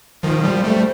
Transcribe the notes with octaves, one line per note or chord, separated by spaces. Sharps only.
D#3 F3 A#4
F3 G3
G3 A3 C5